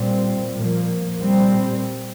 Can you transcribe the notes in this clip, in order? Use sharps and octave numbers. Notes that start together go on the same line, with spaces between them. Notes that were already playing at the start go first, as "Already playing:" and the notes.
Already playing: A#2 G3 C4
A#2 F3 A#3
A#2 G3 C4